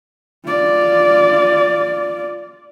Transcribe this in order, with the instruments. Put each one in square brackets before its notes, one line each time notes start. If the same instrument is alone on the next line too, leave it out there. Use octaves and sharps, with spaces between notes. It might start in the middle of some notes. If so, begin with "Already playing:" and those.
[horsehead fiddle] F4 D5